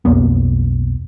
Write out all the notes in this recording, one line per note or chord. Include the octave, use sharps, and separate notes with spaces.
B1 F2 A#3 B3